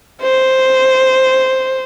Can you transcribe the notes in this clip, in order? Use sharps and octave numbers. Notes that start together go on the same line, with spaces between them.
C5